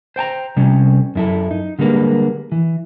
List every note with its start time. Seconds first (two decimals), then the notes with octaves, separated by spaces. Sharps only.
0.16 C5 G5 A5 A#5
0.57 C3 G3 C#4
1.15 F#2 E4 A4
1.51 D#4
1.79 D3 G3 G#3 A#3 B4
2.52 E3